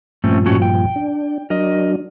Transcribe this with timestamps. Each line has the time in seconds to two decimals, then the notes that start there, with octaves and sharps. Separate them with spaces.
0.24 G2 A#2 F3 A3 C4 C#4
0.46 A2 C#4 F#4
0.62 G5
0.96 D4
1.50 F#3 D4 A#4 D#5